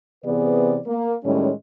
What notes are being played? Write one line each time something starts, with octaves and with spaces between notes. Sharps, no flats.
C3 E3 B3 G#4 B4 D5
A#3
A2 D#3 G3 G#3 C#4